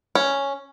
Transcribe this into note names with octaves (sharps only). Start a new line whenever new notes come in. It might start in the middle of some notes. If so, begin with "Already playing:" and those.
C#4